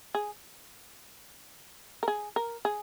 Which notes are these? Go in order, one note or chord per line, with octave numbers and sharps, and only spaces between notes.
G#4
A#4
G#4
A#4
G#4